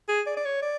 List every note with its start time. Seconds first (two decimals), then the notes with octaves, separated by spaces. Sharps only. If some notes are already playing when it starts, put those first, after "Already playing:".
0.08 G#4
0.26 D5
0.36 D5
0.45 C#5
0.62 D5